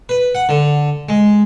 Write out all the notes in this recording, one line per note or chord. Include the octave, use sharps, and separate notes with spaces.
B4
F#5
D3
G#3